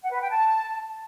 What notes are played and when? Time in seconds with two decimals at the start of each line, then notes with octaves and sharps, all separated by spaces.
0.03 F#5
0.12 B4
0.21 G5
0.30 A5